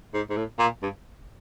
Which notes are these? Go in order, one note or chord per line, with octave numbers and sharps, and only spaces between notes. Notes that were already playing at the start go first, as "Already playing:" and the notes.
G#2
G#2
A2
A#2
G2